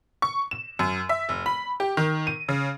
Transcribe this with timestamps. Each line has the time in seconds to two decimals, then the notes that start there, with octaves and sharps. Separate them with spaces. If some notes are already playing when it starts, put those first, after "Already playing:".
0.22 C#6
0.51 E7
0.79 F#2
1.09 E5
1.29 F1
1.46 B5
1.80 G4
1.97 D#3
2.27 D#7
2.49 C#3